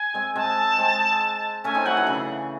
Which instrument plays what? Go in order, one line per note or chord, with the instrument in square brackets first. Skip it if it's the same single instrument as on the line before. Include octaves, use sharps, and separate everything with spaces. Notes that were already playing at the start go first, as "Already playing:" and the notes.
Already playing: [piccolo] G#5
[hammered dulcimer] G#3 C4
[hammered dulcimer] G#3 C4 [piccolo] A5
[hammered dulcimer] G#3 C4
[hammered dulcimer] A3 C#4 [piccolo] G#5
[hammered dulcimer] C4 D#4
[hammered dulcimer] F#3 A3 [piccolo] F#5
[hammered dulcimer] E3
C#3